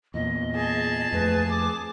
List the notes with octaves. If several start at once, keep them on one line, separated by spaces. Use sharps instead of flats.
E2 A#2 D#5
G#4 A5
F2 A3 B4
D6